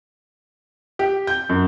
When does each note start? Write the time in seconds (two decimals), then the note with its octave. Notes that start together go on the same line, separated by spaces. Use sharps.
0.99 G4
1.27 G6
1.49 F#2